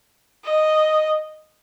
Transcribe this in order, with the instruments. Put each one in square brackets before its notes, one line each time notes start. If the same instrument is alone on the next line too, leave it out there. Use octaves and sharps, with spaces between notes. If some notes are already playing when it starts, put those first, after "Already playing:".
[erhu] D#5